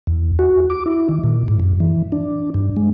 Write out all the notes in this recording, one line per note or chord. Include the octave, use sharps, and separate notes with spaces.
E2
F#4
D6
E4
D#3
A#2
G#2
F#2
E3
D4
G2
G#3